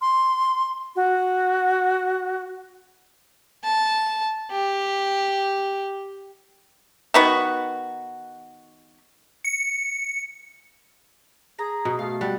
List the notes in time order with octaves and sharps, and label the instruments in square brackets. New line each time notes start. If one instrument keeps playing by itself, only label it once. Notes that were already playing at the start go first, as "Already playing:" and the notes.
[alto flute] C6
F#4
[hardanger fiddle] A5
G4
[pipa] D#3 B3 F#4
[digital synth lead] C#7
[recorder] G#4 [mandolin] A#5
[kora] B2
[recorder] A3 [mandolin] F5
[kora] G3 [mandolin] F#5